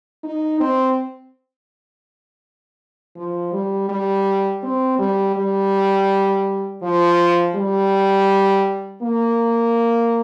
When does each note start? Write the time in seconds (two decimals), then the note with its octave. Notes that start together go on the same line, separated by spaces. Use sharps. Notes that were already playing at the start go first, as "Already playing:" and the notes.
0.24 D#4
0.60 C4
3.16 F3
3.53 G3
3.89 G3
4.63 C4
4.99 G3
5.36 G3
6.82 F3
7.55 G3
9.02 A#3